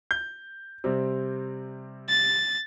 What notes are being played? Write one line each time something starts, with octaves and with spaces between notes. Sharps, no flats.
G6
C3 G3 C4
A6